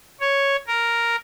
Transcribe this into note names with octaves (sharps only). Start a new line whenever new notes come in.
C#5
A#4